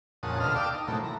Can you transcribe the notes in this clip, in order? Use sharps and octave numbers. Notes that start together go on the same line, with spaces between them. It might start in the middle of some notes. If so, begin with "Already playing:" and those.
F2 A#2 C#3 F#5 A5 D#6
D2 B2 F4 A4 D#5 F6
D5 F5 G5 A5 D6 E6
D#4
A2 C3 E3 F#3 A3 A#3
E3 A#5